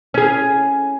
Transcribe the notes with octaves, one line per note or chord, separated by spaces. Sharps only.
C#4 G#4